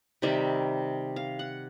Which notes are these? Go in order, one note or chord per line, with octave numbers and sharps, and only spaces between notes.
C3 D#3 G3 E5
F5
F#5